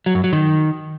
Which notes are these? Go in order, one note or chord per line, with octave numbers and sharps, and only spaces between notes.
F#3
F#2
F#3
D#3